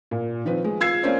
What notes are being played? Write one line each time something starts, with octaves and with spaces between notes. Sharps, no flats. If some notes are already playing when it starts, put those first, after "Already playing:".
A#2
D#3 F3 C4 B4
G#3
F4 E6 G#6 C7
A#3 C4 C#4 C5 D5